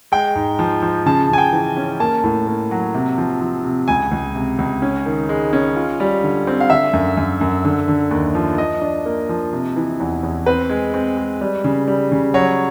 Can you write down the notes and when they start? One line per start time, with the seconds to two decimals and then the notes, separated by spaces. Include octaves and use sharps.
0.12 G#3 G5
0.35 G#2
0.59 F3
0.82 F3
1.06 C#3 A5
1.30 C#3 G#5
1.38 G5
1.53 E3
1.77 C#4
2.00 A#3 A5
2.24 A2
2.47 A#3
2.71 F#3
2.94 C3
3.18 F3
3.41 F3
3.64 C3
3.88 C#2 G#5
4.11 C#2
4.35 C3
4.58 C#2
4.82 C#4
5.06 D#3
5.29 G#3
5.53 C#4
5.76 F4
6.00 G3
6.23 D3
6.47 C4
6.60 F5
6.70 D3 E5
6.93 F#2
7.17 F#2
7.41 F#2
7.64 D3
7.88 D3
8.11 D#2
8.35 F3
8.58 F3 D#5
8.81 D4
9.06 A#3
9.29 F3
9.53 C3
9.76 E3
10.00 E2
10.23 E2
10.46 C4 B4
10.70 G#3
10.94 C4
11.17 G#3
11.41 G3
11.64 C#3
11.88 G3
12.12 C#3
12.34 F#3 C#5